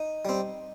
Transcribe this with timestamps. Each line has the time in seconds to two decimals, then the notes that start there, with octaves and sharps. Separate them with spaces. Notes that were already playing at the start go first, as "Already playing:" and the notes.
Already playing: D#4
0.25 G3 C4